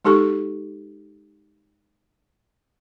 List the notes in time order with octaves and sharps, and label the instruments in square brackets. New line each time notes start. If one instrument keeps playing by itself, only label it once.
[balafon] G#3 D#4 G4 A4 C#6